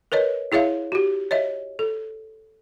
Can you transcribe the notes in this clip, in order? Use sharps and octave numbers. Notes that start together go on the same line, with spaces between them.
A#4 B4 C#5 D#5
E4 G#4 C#5 E5 F5
F#4 G4
C#5 D#5 E5
A4